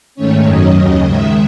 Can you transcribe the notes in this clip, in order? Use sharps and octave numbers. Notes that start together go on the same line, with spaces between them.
G#2 D#3 A3 C#4 C#5
F#2 D#3 F#3 C#4 D#5
D#2 C#3 F#3 D#5
G#2 D#3 G#3 E5